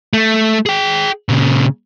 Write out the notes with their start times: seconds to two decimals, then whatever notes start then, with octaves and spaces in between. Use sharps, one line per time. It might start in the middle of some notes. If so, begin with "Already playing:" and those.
0.13 A3
0.66 G#4 G5
1.29 A#2 C#3